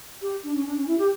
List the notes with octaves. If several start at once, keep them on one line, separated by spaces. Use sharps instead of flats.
G4
D4
C#4
D4
C#4
E4
G4